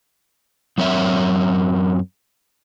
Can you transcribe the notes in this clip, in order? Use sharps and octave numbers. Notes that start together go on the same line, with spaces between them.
F#2 F#3 C4 A#4 C#5 E5